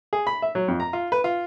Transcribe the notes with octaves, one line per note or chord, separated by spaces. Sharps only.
G#4
B5
E5
F#3
F2
A#5
F4
B4
F4